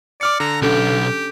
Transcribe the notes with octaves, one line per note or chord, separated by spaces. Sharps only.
D5 D6 F6 C#7
D3 A#5
B1 C#4 D4 G4 A4